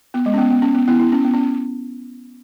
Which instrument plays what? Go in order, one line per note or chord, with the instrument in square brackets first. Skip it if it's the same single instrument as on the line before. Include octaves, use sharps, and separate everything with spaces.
[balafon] B3
G#3
C#4
B3
B3
C#4
B3
B3 E4
B3 E4
C#4
B3
C#4